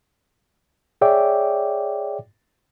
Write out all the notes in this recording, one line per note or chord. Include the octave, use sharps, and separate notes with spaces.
G#4 C#5 D5 E5 G5 D6